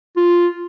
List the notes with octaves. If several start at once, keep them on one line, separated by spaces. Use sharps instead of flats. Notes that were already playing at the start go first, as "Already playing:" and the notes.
F4